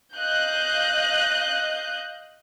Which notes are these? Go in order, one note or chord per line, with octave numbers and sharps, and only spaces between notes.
D#5 F5 F#6 G6